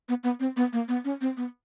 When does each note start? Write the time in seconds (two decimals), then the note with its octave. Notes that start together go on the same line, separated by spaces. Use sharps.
0.09 B3
0.24 B3
0.40 C4
0.57 B3
0.73 A#3
0.88 B3
1.05 C#4
1.21 C4
1.37 B3